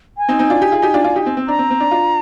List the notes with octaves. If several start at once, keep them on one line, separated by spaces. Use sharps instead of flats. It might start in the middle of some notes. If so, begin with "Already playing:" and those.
G#5
C4 D#4
C4 D#4
D4 F4
D#4 G4
F4 G#4
D#4 G4
D4 F4
D4 F4
D#4 G4
C4
C4
D4 A#5
C4
C4
D4
D4 F4